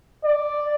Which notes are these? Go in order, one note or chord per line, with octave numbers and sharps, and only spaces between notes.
D5